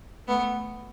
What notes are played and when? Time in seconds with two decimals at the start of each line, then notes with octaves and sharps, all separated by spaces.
0.27 A3 B3